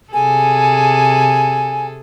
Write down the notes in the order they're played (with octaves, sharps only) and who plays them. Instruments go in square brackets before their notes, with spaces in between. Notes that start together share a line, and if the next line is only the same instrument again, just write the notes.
[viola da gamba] C3 G#4 A4 [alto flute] G#5